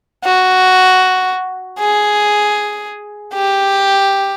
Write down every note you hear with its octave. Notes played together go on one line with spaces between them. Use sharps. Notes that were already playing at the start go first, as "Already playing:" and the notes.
F#4
G#4
G4